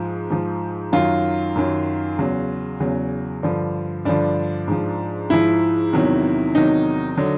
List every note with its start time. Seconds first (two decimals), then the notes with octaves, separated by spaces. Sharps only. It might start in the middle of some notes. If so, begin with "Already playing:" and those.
Already playing: G#2 F3
0.30 G#2 F3
0.92 F#2 D#3 F#3 F4
1.56 F#2 D#3 F#3
2.18 E2 C#3 F#3
2.80 E2 C#3 F#3
3.43 G2 D3 F3
4.05 G2 D3 F3 D4
4.68 G#2 F3
5.30 G#2 F3 E4
5.93 E2 C3 D#3 F#3
6.55 E2 C3 D#3 F#3 D#4
7.18 D3 F#3